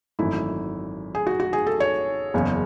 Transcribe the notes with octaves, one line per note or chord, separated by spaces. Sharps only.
G#1 F#2 E3 A3 D#4 E4
G#4
F#4
F#4
G#4
A4
C#5
F#1 E2 C#3